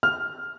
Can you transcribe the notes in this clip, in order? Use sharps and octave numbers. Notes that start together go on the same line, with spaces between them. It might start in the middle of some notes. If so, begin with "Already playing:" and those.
F6